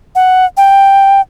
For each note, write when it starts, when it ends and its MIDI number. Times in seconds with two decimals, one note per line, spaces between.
0.15 0.45 78
0.57 1.21 79